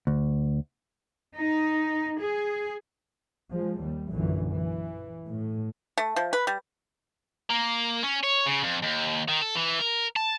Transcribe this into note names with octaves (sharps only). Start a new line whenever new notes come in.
D2
D#4
G#4
F3 G#3
D#2 G3
A#1 F#2 A#2 D3 E3
E3
A2
A3
F3
B4
G3
A#3
C#4
C#5
C#3
F2
D#2
D#3
A4
E3
A#4
A5